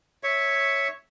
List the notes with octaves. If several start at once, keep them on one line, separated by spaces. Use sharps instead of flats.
C#5 E5 C#6